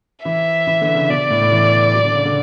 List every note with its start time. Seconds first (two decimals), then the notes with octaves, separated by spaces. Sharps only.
0.25 E3 E5
0.67 E3
0.81 D3
0.95 C#3
1.09 B2 D5
1.30 A2
1.41 A2
1.52 E3
1.94 F#3
2.04 D3
2.15 C#3
2.25 D3